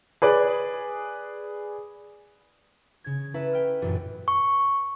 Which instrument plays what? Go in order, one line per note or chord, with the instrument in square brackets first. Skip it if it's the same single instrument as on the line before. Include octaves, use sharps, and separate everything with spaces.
[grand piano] G#4 B4 D5
[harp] C#3 G#6
C#4 E4 A4 B4 E5 A#5
G5 F6
E1 A1 F#2 A#2
[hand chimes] C#6